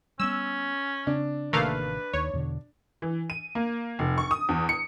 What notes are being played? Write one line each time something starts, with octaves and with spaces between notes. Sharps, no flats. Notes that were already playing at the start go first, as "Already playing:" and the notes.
G3 B3 C#4 E6
C#3 C4 D4
A1 C3 D#3 A3 A#3 B4 F5
D#2 C#5
E2 B2 D3
E3
D#7
A#3
F1
C#6
D#6
E2
C#7